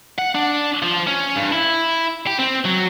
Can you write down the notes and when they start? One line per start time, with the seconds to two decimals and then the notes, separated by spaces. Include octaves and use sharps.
0.18 F#5
0.35 D4
0.83 F3
1.07 C#4
1.36 G2
1.52 E4
2.27 G4
2.39 C4
2.65 F#3